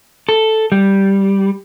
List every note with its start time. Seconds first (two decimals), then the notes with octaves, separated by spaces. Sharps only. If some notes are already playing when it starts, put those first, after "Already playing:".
0.29 A4
0.72 G3